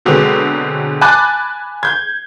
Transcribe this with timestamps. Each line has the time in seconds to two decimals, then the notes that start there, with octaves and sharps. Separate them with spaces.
0.05 B2 D3 F#3 G#3 C4
1.01 G#5 A5 B5 D6 F#6 A6
1.83 G6 G#6